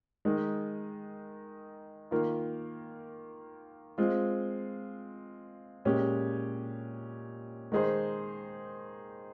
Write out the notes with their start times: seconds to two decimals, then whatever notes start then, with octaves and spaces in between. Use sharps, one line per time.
0.25 D#3 G#3 D#4
2.11 D#3 A#3 F4
3.98 G#3 C4 F4
5.85 A#2 G#3 C#4 G4
7.72 D#3 G#3 D#4 G#4 C5